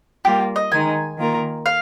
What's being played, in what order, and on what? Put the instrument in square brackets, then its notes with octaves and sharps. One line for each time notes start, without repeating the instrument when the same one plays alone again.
[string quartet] G3 A#3 F4 [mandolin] G4
[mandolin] D#5
[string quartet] D#3 G#3 D#4 [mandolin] G#5
[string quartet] D#3 A#3 F4 A#4
[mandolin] F5